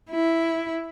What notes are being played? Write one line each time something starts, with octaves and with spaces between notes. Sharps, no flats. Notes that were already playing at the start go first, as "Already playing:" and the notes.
E4